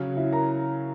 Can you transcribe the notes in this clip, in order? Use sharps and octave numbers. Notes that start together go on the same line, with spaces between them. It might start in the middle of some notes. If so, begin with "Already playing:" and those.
Already playing: C#3 F#3 C#4
E4 E5
A#4 A#5